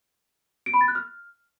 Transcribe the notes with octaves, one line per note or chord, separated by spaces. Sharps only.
D7
B5
A6
F#6
F6